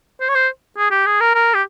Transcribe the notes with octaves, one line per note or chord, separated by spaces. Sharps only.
C5
C#5
C5
G#4
G4
G#4
A#4
A#4
G4